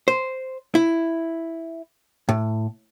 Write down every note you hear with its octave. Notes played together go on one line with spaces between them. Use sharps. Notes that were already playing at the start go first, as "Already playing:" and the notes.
C5
E4
A2